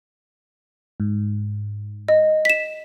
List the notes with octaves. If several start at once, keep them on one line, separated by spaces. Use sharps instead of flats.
G#2
D#5
B6 E7